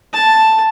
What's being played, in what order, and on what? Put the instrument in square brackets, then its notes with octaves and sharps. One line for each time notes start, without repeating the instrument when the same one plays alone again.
[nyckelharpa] A5